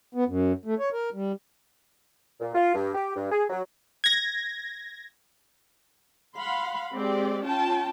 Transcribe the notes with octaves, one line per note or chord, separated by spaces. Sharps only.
B3
F#2
A3
C#5
A#4
G3
A#2
F4
G2
G4
G2
G#4
F#3
G#6 A#6
F5 F#5 B5 C6
G#3 C4 G4 D5
C#4 F4 G5 A5